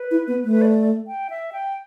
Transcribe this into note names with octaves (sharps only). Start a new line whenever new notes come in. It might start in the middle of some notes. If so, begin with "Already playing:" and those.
Already playing: B4
E4
B3
A3
B4
D5
G5
E5
G5